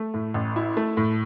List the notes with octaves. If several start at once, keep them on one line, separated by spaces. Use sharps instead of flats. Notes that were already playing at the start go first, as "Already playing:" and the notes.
Already playing: A3
A2
A1
E4
A3
A2